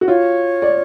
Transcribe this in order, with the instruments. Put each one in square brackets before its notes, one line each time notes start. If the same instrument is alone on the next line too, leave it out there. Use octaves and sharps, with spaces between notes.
[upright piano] F#4
[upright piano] F4 [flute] C#5
[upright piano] D5